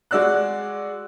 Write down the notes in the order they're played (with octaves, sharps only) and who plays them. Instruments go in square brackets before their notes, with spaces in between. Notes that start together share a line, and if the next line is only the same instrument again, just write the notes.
[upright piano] G#3 F#4 D5 E6 F#6